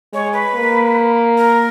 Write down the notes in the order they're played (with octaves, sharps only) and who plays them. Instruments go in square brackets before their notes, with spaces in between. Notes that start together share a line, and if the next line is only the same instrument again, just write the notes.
[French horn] G#3 [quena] C#5
[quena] B4
[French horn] A#3
[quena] A#4